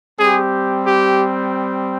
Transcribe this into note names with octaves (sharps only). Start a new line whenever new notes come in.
G3 C4 G4 G#4
G4